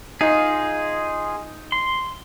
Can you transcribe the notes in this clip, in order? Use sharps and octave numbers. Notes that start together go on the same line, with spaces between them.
D#4 F4 G#4
C6